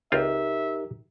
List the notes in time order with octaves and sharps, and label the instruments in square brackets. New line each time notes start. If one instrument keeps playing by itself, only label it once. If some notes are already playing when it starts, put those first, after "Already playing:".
[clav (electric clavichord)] C#2 C4 F4 [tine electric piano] D#4 G4 A#4 [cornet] E5